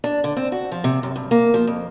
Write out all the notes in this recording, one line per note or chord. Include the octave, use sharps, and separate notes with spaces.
D4
D3
C4
F#4
F3
C3
F#2
G2
A#3
F3
F2